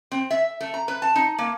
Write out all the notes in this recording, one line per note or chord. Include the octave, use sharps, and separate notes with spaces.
C4
E5
A3
A#5
B4
A5
D#4
A#3